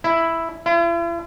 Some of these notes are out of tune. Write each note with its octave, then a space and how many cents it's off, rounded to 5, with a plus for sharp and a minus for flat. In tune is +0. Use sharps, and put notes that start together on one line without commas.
E4 +0
E4 +45